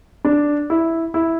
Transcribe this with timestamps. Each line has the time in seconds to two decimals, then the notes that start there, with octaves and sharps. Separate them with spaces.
0.25 D4
0.70 E4
1.14 E4